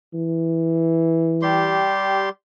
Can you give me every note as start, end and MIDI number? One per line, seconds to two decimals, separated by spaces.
0.14 1.87 52
1.42 2.29 55
1.42 2.29 67
1.42 2.29 84